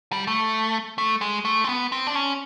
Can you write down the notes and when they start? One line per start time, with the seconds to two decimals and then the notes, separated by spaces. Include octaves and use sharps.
0.13 G3
0.27 A3
0.98 A3
1.21 G#3
1.45 A3
1.64 C4
1.69 B3
1.92 C4
2.07 D4
2.15 C#4